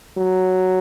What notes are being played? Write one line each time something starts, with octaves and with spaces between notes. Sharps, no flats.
F#3